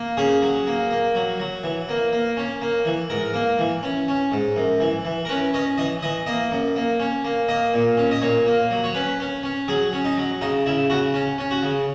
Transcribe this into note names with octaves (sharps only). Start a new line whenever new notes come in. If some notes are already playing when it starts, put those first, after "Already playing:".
Already playing: A#3
C#4 G#4
F#3
A#3
A#3
F#3
F#3
E3
A#3
A#3
C#4
A#3
E3
G#2 A#4
A#3
E3
C#4
C#4
G#2
F#2
E3
E3
A#4
C#4 B4
C#4 D#5
E3 D#5
E3 D#5
A#3 D#5
F#2
A#3
C#4
A#3
A#3 D#5
A#2
C#4
D#5
A#2 C#5
A#3
F#3
C#5
C#4 B4
C#4
C#4
F#3 G#4
C#4
D#4
F#3
C#3 D#4
C#3 E4
C#3 F#4
C#4
C#4
F#4
C#3